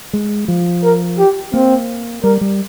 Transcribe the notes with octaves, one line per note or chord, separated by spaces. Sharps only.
G#3
F3
A#4
G4
A#3 C4
G3 A#4
G3